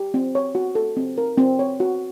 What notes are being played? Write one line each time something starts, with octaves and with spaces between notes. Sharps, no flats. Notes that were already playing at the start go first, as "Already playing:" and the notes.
Already playing: G4
C4
C#5
F#4
A4
C4
A#4
C4
C#5
F#4